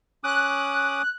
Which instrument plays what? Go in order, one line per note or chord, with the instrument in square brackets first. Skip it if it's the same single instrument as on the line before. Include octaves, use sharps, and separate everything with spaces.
[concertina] C#4 D6 D#6 [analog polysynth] F#6